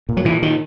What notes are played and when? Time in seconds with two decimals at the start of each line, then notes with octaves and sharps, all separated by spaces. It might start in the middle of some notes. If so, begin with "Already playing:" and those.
0.09 A#2
0.17 F#3
0.25 A#2 E3
0.42 D#3